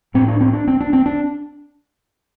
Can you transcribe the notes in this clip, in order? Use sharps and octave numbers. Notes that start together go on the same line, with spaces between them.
A2 C4
D4
C4
D4
C4
D4
C4
D4